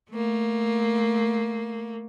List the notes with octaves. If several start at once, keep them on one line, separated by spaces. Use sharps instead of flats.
A3 A#3